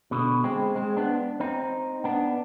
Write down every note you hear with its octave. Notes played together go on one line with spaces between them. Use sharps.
B2 D3
G#3 C4
G#3 C4
B3 D4
C4 D#4
B3 D4